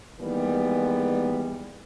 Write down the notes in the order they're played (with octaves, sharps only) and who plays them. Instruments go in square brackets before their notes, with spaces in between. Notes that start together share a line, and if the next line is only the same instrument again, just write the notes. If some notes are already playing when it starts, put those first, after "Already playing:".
[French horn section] D#3 E3 G3 G#3 A#3 B3